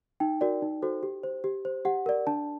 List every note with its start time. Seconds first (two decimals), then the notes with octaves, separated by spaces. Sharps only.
0.20 D#4 G5
0.41 F#4 A#4 D5
0.62 D#4
0.82 F#4 A4 C5
1.03 G4
1.24 C5
1.44 G4
1.65 C5
1.85 G4 F#5
2.06 A#4 D5
2.27 D4 A5